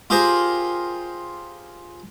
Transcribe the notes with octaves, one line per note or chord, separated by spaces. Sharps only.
F4 G4 G#4 A#4 C5